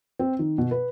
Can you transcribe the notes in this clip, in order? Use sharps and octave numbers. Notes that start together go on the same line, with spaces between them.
C4
D#3
B2
B4